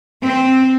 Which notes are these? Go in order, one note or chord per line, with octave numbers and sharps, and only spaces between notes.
C4